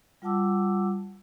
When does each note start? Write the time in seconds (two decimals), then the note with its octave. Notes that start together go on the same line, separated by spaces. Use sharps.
0.22 G3 F4 F#5 A5 D6 E6